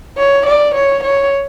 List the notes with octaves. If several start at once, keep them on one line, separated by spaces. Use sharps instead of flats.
C#5
D5
C#5
C#5